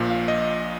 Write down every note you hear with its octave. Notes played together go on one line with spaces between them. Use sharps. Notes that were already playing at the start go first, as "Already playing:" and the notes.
Already playing: A#1 A#2 F3
F5
D#5